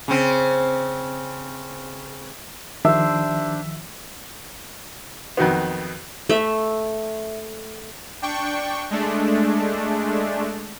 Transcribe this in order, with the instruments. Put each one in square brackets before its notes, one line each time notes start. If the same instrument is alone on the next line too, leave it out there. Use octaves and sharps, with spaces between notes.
[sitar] C#3 C4
[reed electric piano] D#3 F3 [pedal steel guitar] D4 C5 [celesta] G4 E6 [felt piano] E5
[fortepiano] F2 D#3 F#3 B3
[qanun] A3 E5
[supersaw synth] D4 G5 C#6
G#3 A3 D4